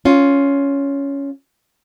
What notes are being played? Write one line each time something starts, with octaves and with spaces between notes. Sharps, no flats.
C#4 F4